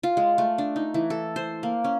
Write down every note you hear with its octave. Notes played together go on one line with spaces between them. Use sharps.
F4
G#3
A3
D4
D#4
E3
A4
C5
A#3
C#4